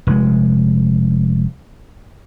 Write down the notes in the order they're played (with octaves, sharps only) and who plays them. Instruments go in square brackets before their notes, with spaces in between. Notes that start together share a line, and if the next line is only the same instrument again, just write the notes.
[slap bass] F1 G#3